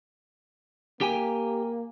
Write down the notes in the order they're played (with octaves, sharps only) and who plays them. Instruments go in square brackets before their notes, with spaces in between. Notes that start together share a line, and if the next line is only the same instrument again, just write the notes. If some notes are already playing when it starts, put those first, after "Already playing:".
[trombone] A#3 [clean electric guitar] G4 G5 G#5